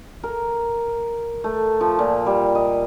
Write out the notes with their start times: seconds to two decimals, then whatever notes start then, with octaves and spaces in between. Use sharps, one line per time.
0.23 A#4
1.44 A3
1.81 F3
1.99 A#2
2.26 G3
2.55 D#5